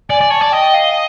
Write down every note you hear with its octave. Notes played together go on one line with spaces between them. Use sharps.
D5 G#5
D5
C#5 A5
D5
D#5 G5
F5